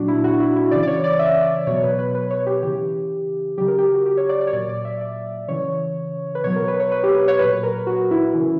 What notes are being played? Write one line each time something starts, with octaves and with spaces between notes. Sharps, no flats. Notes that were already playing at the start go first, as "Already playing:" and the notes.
Already playing: A#2 F#3 D4 F#4
E4
F#4
E4
E4
C#3 E3 D5
D5
C#5
D5
E5
D5
B2 F#3 C#5
B4
B4
B4
C#5
G4
C#3 E3 G4
C#3 F#3 G4
A#4
G4
F#4
G4
C#5
D5
D5
C#5
A#2 F#3 D5
D5
E5
D5
C#3 E3 C#5
B4
B2 F#3 C#5
A#4
B4
C#5
B4
G4
B4
C#5
A#2 F#3 B4
A#4
F#4
E4
C#3 E3